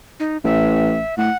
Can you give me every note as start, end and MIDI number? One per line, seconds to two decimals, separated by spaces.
0.20 0.37 63
0.44 1.01 33
0.44 1.17 76
1.17 1.30 45
1.17 1.37 78